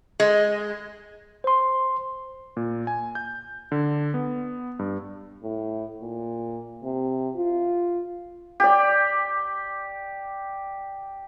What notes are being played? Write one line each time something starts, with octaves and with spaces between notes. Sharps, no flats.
G#3
C5 C6
A#2
G#5
G6
D3
B3
G2
A2
A#2
C3
F4
G4 D5